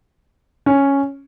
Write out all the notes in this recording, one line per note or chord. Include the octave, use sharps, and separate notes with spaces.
C#4